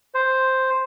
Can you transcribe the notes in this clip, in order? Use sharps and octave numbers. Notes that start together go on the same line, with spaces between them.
C5